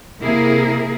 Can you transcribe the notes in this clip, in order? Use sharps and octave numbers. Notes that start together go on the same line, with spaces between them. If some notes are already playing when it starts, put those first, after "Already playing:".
C3 A#3 E4 G#4 A#4